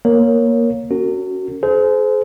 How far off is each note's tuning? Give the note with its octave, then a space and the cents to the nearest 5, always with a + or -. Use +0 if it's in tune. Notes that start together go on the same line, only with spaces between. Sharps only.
A#3 +15 A#4 +0 C#5 +0
C#4 +0 F#4 +10 A#4 -45
G#4 +40 C5 -25